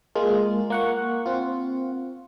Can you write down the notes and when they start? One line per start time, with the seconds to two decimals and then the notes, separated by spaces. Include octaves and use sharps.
0.15 G#3 A#3 F4
0.70 A#3 F#5 C#6
1.26 C4 F4